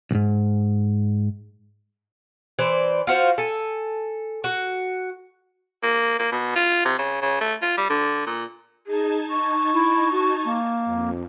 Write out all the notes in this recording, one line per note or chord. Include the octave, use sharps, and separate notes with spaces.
B1 G#2
E3 C5 D5
F4 F#4 C5 F5
A4 G#5
F#4
A#3
A#3
B2
F4
C3
C#3
C#3
A3
F4
G3
D3
A#2
D#4 G#4 A5 G#6
C#6
E4
F#4
A#3
F2